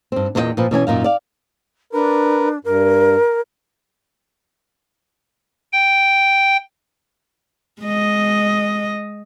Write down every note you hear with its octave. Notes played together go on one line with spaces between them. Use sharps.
G2 C4
E2 A#2 D#4 F4 D#5 G5
A#2 F3 B4
B2 E3 C#4 G#5
F#2 A#2 D#4 F5
D5 F5
D4 A#4 B4
G2 A#4
G5
G#3 D#5